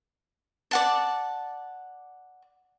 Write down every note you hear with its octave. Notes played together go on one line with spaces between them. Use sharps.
D5 F#5 A5